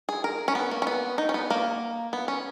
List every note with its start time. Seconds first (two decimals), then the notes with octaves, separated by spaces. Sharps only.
0.09 G#4
0.24 A#4
0.48 C#4
0.55 B3
0.71 A#3
0.82 C#4
0.87 B3
1.18 D#4
1.29 C#4
1.34 B3
1.50 A#3
2.13 B3
2.28 C#4